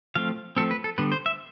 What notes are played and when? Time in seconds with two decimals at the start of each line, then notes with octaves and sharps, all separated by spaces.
0.15 F3 A3 C4 F5
0.56 F3 A3 C4 A4
0.71 B4
0.84 A4
0.98 D3 G3 B3 B4
1.12 C5
1.26 E5